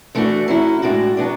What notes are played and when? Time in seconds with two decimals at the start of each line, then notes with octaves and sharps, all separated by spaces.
0.15 E3 A3 D4 F#4
0.48 F#3 C#4 E4
0.82 A2 G#3 D4 F#4
1.17 F#3 B3 D4